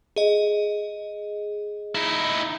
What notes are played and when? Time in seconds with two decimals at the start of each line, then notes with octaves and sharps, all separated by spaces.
0.16 G#4 D#5
1.95 D#4 E4